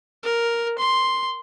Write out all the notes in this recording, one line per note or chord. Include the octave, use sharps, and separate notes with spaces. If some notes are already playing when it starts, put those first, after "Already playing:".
A#4
C6